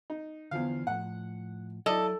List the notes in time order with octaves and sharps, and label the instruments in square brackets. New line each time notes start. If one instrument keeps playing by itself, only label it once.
[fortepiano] D#4
[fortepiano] E2 F3 F5 [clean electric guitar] D3 E3
[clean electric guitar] A2 F3 [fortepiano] F#5
[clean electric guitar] F#3 [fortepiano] E4 D5 D#5 [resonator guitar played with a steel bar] A4